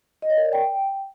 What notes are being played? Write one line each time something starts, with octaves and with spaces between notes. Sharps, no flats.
D#5
C#5
A#4
D5
G5